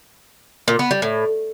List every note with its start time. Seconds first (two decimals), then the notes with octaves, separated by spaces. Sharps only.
0.68 A#2
0.79 B3
0.91 G3
1.02 A2